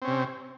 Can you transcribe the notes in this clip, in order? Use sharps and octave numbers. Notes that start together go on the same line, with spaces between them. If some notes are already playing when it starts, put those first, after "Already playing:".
C3 C4 C#4